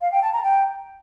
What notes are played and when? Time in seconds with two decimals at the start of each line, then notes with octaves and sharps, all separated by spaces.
0.01 F5
0.12 G5
0.22 A5
0.33 A#5
0.43 G5